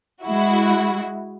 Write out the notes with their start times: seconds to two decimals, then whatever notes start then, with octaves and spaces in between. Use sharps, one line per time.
0.23 G#3 E4 F#4